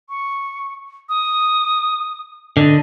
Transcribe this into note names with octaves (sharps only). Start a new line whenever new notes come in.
C#6
D#6
D3 D#5